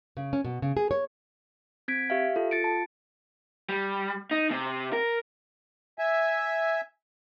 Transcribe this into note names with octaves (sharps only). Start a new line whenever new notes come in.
C#3
C#4
B2
C#3
G#4
C#5
C4 G#6 B6 D7
G4 E5 F5
F4 A4
F4 A6 C#7 D7
A5
G3
D#4
C3
A#4
E5 G#5